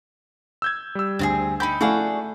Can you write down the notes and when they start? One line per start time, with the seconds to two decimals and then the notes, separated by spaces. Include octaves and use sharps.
0.62 E6 G6 G#6
0.95 G3 E6
1.19 D2 C4 F4 G#4
1.60 D#4 G4 B5 G6
1.81 A3 E4 F#4 G#4 D5 F5